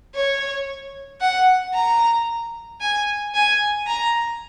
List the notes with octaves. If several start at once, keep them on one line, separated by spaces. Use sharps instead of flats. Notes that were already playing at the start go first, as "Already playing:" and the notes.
C#5
F#5
A#5
G#5
G#5
A#5